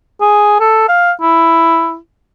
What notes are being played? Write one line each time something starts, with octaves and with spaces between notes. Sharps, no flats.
G#4
A4
F5
E4